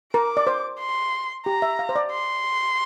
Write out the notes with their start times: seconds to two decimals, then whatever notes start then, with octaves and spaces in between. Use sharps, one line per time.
0.14 A#4 D6
0.37 D5
0.47 C5
0.80 C6
1.46 G4 A#5
1.62 E5
1.79 F5
1.89 C5
1.96 D5
2.12 C6